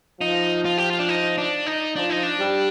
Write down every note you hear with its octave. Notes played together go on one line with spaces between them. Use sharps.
F3 D#4
F4
G4
F4
D4
D#4
D4
D#4
F3 D4
D#4
D4
G3